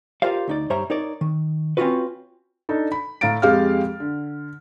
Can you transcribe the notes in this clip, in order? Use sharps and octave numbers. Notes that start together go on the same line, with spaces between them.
F4 G4 A#4 C5 D5 F5
D2 D#4 D5
G2 G3 C5 C#5 E5 A#5
D#4 A#4 C#5 D5
D#3
C4 C#4 D#4 F4 F#4 B4
D4 D#4 A4
B5
A2 F5 A#5 A6 D7
F2 G#3 G4 F5 G5 F6
D3